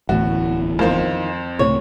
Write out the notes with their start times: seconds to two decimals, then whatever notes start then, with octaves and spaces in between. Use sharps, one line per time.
0.09 D1 A1 E2 A2 F#4
0.79 F2 D#3 A#3 C5
1.59 C#2 A2 C3 C#5